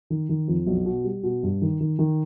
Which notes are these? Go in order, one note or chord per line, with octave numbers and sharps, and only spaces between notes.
D#3
D#3
F2
B1
B2
G3
B2
G2
D#3
D#3
D#3